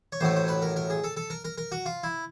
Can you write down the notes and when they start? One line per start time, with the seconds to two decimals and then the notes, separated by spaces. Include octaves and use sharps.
0.12 C#5
0.20 A1 A2 F#3 A3 C5
0.36 C5
0.48 B4
0.62 A#4
0.76 A#4
0.90 G#4
1.04 A4
1.17 A4
1.30 A#4
1.45 A#4
1.58 A#4
1.72 F#4
1.86 F4
2.03 E4